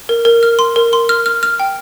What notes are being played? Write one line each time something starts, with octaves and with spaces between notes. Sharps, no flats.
A#4
A#4
F6
C6
A#4
C6
F6
F6
F6
G5